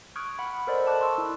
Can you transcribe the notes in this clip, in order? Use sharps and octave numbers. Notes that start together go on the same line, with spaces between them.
C#6 D#6 F6 F#6 G#6 D7
F#5 B5
A4 A#4 C5 D5 D#5
A5 D6 F#6
C6 C#6 E6
E4